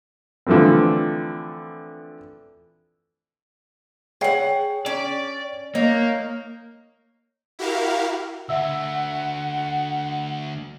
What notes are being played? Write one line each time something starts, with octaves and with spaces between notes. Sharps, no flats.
D3 E3 F3 A3 C4
G#4 C#5 F#5 G5 C7
C#4 D5
A#3 D#4 C#5
E4 F#4 G4 A#4 F5
D2 E5 F#5 E6